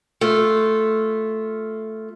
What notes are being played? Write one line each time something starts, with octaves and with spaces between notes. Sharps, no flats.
A3 F4